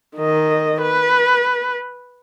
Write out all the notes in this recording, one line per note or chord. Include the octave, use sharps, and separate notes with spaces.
D#3 D#5
B4